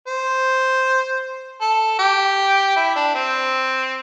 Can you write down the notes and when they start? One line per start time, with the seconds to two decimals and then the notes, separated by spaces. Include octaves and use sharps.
0.07 C5
1.61 A4
1.99 G4
2.76 E4
2.96 D4
3.14 C4